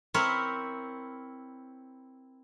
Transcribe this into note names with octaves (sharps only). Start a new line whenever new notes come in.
C4 E4 A#4 C#5 B5